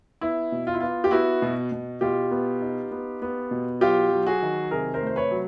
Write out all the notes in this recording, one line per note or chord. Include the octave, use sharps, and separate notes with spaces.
B3 E4
B2
F4
E4
B3 F4
G4
B3 E4 F#4
B2
B2
B2 F4 G4
B3
D#4
B3
B3
B2
F#3 F4 G4
F#3
F#4 G#4
D#3
C3 G#4 A#4
A#4 C5
A3
C5
B4 C#5
F#3